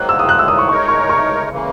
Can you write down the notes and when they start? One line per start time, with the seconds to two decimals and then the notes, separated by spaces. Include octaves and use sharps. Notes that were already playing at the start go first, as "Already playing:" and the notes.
Already playing: G#2 D#3 F#3 A#3 F#6
0.09 E6
0.19 D#6
0.29 F#6
0.39 E6
0.48 D#6
0.58 C#6
0.69 G#3 D#4 A#4 C#5 C#6
0.88 C#6
1.09 C#6
1.51 C#3 E3 A#3